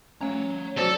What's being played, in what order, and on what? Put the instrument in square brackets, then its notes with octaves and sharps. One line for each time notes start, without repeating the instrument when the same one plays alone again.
[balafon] A3 C#4 [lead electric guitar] C#5 A#5
[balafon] F#3 F#4 C5 [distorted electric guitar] A4 [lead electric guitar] D5